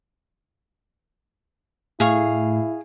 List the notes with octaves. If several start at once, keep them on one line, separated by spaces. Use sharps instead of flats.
A2 E4 G#4 F5 C#6